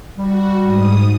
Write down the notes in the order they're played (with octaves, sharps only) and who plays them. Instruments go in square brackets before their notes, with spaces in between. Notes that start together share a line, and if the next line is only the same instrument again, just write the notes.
[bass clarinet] G3 [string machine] F#4
[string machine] G#2 D#6